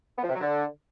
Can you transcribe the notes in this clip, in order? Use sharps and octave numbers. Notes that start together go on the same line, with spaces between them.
B3
F3
C3
F#3
D3